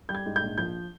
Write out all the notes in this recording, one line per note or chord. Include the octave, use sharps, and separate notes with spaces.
G3 G6
G#6
G#2
G6
A#1
F3 G6